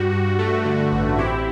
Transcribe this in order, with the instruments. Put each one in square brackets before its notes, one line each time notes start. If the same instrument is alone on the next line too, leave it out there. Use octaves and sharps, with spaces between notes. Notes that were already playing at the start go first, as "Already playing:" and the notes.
Already playing: [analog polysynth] G2 G3 F#4
G2
A3
D3
A1
C4 E4 G4